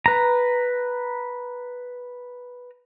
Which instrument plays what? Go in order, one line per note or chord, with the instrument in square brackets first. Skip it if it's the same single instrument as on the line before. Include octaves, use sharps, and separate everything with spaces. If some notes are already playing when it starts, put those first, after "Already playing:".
[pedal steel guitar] B4 A#5